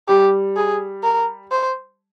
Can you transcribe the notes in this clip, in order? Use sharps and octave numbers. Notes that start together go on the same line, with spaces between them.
G3 G4
G#4
A#4
C5